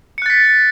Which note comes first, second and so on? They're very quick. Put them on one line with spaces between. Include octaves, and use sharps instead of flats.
C#7 F#6 A6 B6